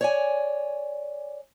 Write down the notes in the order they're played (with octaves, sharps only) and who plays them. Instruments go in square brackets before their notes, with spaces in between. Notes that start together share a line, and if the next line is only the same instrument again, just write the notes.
[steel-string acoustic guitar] C#5 D5 G#5